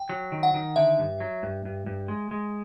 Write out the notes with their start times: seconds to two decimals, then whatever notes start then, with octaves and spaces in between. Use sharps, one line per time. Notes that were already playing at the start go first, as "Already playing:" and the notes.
Already playing: G5
0.09 F#3
0.32 D#3
0.43 F#5
0.54 D#3
0.76 D3 E5
0.99 G2
1.20 F#3
1.43 G2
1.65 G2
1.86 G2
2.08 G#3
2.31 G#3